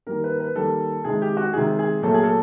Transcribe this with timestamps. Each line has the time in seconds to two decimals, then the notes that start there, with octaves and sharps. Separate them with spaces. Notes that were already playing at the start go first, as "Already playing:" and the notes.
0.07 D#3 G3 A#3 A#4
0.24 B4
0.34 A#4
0.40 B4
0.55 D#3 G3 A#3 A4
1.04 C3 D#3 G#3 G#4
1.22 G4
1.37 F#4
1.53 C3 D#3 G#3 G#4
1.79 G#4
2.02 A#2 F#3 A3 A4
2.14 G#4
2.24 A4